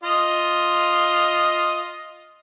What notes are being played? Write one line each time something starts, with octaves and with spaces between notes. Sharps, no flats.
F4 D#5